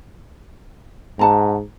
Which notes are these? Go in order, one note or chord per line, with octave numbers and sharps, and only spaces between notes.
G#2 F#5 A5 A#5